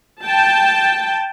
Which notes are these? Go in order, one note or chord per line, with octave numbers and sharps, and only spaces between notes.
G5 A5